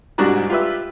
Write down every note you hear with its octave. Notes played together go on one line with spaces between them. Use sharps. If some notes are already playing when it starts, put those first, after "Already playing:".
C2 G#2 G3 D4 F#4 A#5
F4 G4 B4 E5